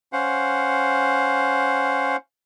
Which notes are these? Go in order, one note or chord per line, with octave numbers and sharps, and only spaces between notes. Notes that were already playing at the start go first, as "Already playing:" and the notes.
C#4 C5 F5 F#5